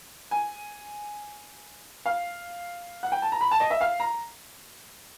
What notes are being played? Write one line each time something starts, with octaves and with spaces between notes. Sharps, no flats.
G#5
F5
F#5
G5
A5
A#5
B5
A5
D#5
E5
F5
A#5